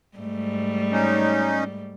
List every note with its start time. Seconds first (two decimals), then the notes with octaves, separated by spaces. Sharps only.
0.17 G#2 G3 A3
0.92 C#4 D#4